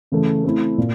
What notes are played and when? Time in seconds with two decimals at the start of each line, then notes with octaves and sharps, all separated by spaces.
0.12 C#3 E3 A3
0.44 A3 C4 E4
0.78 A#2